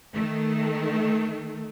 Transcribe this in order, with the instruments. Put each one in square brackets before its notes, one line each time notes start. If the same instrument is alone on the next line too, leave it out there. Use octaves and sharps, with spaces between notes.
[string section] D#3 A3